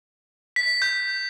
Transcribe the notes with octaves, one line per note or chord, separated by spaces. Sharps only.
B6
G6